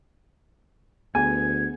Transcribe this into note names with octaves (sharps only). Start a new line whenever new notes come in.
D2 B3 G#4 G#5 G#6